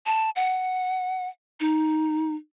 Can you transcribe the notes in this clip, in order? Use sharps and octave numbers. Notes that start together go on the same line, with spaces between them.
A5
F#5
D#4